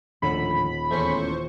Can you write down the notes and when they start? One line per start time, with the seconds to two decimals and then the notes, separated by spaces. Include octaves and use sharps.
0.22 D#1 A2 D3 F3 B5
0.91 E2 A3 C#4 C5 C#6